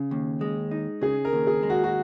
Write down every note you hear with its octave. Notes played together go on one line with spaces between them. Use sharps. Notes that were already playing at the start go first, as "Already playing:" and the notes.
Already playing: C#3
D#2
G#3
D#4
C#3 G#4
A#4
D#2
G#4
G#3
F#4
F#4